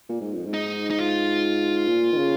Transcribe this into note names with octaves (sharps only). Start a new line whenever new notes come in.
A#2
G#2
F2
G#2
D#4
D#4
F4
A#2
D#3
C#3